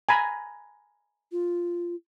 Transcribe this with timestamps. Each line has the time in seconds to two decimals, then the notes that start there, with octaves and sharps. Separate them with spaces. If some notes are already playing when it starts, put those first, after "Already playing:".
0.09 G#5 A#5 B5
1.32 F4